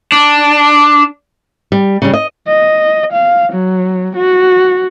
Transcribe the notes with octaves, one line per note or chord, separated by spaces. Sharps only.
D4
G3
C#3 G3
D#5
D#5
F5
F#3
F#4